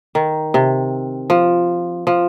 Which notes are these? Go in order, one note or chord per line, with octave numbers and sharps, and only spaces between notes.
D#3
C3
F3
F3